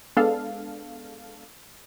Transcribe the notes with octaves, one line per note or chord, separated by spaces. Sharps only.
G#3 B3 D4 A4 F5